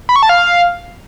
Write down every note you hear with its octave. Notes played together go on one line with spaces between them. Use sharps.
B5
C#6
A5
F5